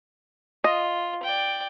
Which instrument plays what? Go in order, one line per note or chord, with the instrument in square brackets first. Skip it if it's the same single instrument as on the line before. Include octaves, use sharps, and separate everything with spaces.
[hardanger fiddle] F4 [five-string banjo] D#5
[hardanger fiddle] D5 G5